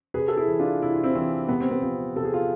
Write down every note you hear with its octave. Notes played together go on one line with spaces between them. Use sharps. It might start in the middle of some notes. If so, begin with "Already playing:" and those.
C3 G#4 B4
A4
E4 G#4
E3
D4 F4
C3 E4
F4
C4 E4
E3 C4
C3 B3
C4
B3
F3 C4
C3 A4
G#4
F4